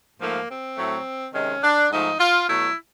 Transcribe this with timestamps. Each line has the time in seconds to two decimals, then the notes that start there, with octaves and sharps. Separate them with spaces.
0.20 G#2 F3 A3 A#3
0.49 C4
0.77 A2 F#3 A3
1.34 C3 D#3 G#3 C#4
1.63 D4
1.91 G#2 F3 A3 D#4
2.19 F4
2.48 B2 F#3 A3 E4